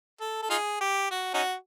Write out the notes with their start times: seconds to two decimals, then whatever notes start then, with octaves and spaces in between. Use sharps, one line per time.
0.21 A4
0.42 A4
0.50 D#4 F4 G#4
0.81 G4
1.10 F#4
1.34 C#4 D#4 F#4